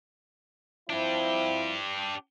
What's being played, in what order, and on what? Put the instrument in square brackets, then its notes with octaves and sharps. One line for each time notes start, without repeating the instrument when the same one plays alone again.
[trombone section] F3 C4 E4 [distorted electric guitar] D4 G4